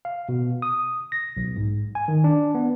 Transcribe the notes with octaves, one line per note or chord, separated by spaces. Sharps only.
F5
B2
D#6
A#6
B1
G#2
G#5
D#3
D4
B3